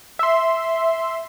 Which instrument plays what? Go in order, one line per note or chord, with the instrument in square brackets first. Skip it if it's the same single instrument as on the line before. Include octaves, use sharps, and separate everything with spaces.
[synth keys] E5 C6